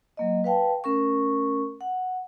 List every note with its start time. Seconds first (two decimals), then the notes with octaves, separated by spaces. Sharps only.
0.17 F#3 A#3 D#5
0.44 B4 F5 G5 A5
0.84 A3 C#4 A#4 C#6
1.81 F#5